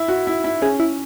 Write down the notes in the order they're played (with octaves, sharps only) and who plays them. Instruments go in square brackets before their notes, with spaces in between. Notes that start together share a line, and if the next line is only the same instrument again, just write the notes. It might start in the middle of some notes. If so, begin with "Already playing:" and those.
Already playing: [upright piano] E4
F#4
E4
E4
[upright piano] C#4 [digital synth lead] G#4
[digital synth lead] E4